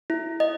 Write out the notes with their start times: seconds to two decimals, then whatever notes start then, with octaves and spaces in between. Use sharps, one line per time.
0.10 E4
0.40 D#5